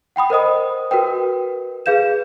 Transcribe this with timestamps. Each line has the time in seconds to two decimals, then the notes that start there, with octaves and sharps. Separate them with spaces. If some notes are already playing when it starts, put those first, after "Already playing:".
0.16 F#5 G5 B5 D#6
0.30 A#4 C5 D#5 D#6
0.91 F#4 A#4 B4 G5
1.86 G#4 B4 F5 G6 E7